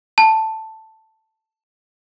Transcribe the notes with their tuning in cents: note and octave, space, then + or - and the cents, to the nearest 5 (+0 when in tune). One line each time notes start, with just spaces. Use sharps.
A5 +5